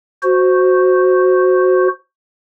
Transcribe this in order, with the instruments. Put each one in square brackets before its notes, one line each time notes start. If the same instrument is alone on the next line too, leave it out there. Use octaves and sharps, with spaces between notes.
[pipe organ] F#4 C5